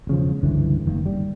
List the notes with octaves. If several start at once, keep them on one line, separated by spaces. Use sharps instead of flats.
E1 C#3 F3
C#2 G2 D3 E3
F#1 D#3 A#3
G3